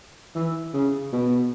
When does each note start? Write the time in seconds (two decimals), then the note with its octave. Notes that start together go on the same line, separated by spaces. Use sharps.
0.35 E3
0.73 C#3
1.13 B2